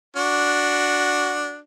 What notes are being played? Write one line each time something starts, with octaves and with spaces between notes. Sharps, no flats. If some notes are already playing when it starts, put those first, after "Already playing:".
D4 F#4